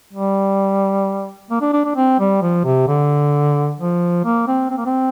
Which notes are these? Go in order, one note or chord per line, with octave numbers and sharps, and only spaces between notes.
G3
A#3
D4
D4
D4
C4
G3
F3
C3
D3
F3
A#3
C4
C4
A#3
C4